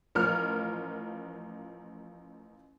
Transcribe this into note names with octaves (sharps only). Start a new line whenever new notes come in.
A1 F3 A#4 F6